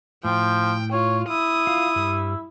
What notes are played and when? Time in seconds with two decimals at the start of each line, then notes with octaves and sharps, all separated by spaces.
0.25 A2 F3 G5
0.92 F4 C#5
1.28 E4 D#6
1.67 F4
1.96 G2 G3